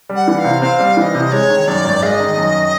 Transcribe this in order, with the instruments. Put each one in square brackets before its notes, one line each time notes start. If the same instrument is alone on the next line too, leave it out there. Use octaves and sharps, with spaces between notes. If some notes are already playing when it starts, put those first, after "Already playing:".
[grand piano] G3
[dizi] F#5
[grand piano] E3
[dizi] F5
[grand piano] C3
[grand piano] C4 [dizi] F5
[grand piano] G3
[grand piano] E3 [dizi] F5
[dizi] D#5
[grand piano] C3
[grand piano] G#3 [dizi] C#5
[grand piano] D#3
[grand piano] F#2 [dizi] D5
[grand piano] G#1
[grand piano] G#3 [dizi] F5
[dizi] D#5
[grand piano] D#3
F#2